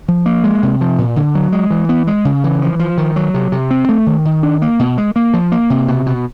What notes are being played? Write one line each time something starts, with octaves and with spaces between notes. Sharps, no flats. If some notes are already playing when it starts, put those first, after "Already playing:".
F3
A#3
G#3
C3
F3
A#2
D3
F#3
G#3
E3
B3
G#3
C#3
E3
F3
F3
D#3
F#3
C3
C3
C4
A3
D#3
D#3
D4
A#3
B2
G#3
A#3
F3
A#3
C3
B2
B2